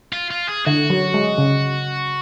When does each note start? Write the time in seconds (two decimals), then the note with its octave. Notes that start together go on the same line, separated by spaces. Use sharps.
0.13 F4
0.31 F4
0.48 G#4
0.66 D3 F#4
0.90 F#3
1.14 G#3
1.38 C#3